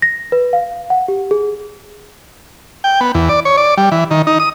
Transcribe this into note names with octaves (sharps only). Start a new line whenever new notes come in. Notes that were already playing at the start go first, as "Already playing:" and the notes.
A#6
B4
F5
F#5
G4
G#4
G5
B3
E2
D5
C#5
D5
G3
E3
D#3
D#4
D#6